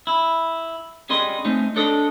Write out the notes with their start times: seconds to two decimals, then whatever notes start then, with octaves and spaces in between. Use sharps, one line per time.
0.07 E4
1.09 G3 C#4 G#4 D#5 C6
1.45 A3 C4 C#4 D#4
1.76 D4 A4 C#5 D#5